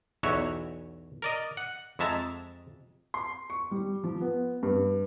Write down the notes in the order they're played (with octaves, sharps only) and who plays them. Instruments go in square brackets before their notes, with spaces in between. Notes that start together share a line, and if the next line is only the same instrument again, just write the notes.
[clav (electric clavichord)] B1 E2 F#4 C#5 E5
A#4 D5 D#5
F#5
F2 G#3 E5 A5 A#5
[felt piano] C6
C#6
G3
F3
B3
G2